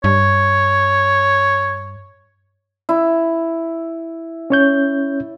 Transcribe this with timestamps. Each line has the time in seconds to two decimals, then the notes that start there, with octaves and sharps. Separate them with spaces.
0.04 G2 C#5
2.89 E4
4.50 C#4 C#5 G6